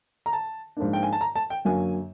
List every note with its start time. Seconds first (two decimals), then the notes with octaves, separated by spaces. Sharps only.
0.26 A#5
0.33 A5
0.77 G#2 F3 A#3 D4
0.93 G5
1.03 G#5
1.13 A5
1.21 A#5
1.36 A5
1.50 G5
1.65 F#2 D3 F#3 A#3 G#5